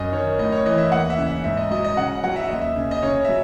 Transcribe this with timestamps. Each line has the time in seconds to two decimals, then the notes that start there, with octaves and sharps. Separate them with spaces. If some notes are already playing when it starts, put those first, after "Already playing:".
Already playing: F#2 D#5
0.12 D#3 C#5
0.39 A2 D#5
0.52 C#5
0.66 E3 D#5
0.78 E5
0.91 D#2 F#5
1.10 E5
1.18 C#3
1.26 E5
1.44 G#2 E5
1.57 D#5
1.71 F#3 D#5
1.84 D#5
1.97 C#3 F#5
2.24 F#3 F#5
2.36 E5
2.49 D#2 D#5
2.61 E5
2.76 C#3
2.91 D#5
3.02 C#3 C#5
3.25 E5
3.29 F#3